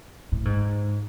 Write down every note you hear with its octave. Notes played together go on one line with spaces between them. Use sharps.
A2
G#2